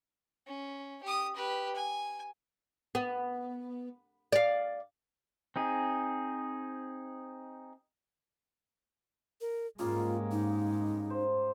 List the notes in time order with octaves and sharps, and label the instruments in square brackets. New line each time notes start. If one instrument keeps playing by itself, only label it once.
[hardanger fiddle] C#4
G4 D#6
G4 B4
G#5
[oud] B3
D5 F5
[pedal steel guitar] C4 D#4 G#4
[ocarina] A#4
[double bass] G#2 G#3 [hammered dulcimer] C#3 G3 A#3 [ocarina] F4
[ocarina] D#4
[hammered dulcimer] C5